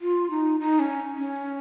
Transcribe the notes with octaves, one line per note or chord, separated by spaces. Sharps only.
F4
D#4
D#4
C#4
C#4